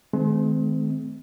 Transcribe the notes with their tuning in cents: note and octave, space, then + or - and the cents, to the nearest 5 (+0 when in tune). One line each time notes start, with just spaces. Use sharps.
D#3 +0 G#3 +40 C4 -35